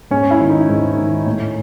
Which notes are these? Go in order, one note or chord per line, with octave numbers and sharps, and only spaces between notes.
G#2 C#4
E4
D#3
D#4
G#2
D#3
A2